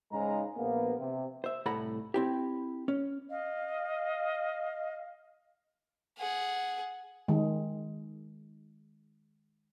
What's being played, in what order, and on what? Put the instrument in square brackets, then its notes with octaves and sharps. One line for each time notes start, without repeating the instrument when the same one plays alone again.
[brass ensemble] G#2 C#3 G#3 A#5
A#1 A#3 B3
C3
[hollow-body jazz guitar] C5 E5
C2 A2 A4 F#5 A#5 B5
C4 E4 G4
C#4
[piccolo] D#5 [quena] F5
[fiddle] G#4 F#5
[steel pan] D#3 G#3